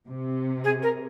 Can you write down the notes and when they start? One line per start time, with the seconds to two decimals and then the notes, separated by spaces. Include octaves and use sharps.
0.09 C3
0.64 G#4
0.83 A#4